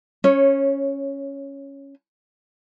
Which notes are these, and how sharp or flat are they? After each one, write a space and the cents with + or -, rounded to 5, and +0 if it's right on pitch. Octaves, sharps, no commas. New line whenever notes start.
C#4 +0 C#5 -15